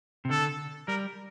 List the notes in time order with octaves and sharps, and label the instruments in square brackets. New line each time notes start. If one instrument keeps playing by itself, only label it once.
[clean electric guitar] C3
[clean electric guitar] D3 [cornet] A4
[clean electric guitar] G3 [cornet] A#4